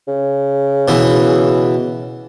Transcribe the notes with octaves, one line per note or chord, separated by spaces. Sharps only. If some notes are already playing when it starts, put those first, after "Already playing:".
C#3
B2 E3